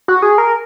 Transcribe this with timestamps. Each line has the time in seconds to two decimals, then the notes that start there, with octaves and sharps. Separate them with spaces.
0.08 F#4
0.22 G#4
0.38 A#4